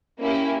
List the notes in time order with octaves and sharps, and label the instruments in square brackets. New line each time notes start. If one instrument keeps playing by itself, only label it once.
[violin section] A#3 C#4 E4 G4